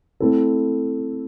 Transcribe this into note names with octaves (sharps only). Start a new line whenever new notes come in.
A3 C4 E4 A4